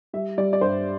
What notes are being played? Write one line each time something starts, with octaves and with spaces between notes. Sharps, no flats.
G3 E5
G3 D5
D5
G2 C5